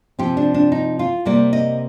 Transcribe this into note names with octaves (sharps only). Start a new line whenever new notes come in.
C3 F3 C4 G4
D4
D4
D#4
F4
C3 G3 A#3 D5
D#5